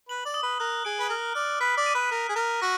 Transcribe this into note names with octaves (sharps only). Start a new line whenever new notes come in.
B4 F#7
D5
D#6
B4
A#4 F#6
G#4 D7
B4
A#4 F6
D5 F6
B4 B6
D5
D#7
B4
A#4 F6
G#4
A#4 F6
F#4 A#6